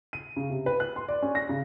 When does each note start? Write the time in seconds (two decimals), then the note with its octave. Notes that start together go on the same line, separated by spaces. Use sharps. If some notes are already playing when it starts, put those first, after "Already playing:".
0.13 D#7
0.37 C#3
0.50 C3
0.66 B4
0.80 F#6
0.96 C6
1.08 D5
1.22 C#4
1.35 A#6
1.49 C#3